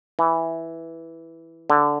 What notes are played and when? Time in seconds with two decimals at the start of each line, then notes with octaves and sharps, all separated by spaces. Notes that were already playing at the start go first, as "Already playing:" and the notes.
0.19 E3
1.70 D3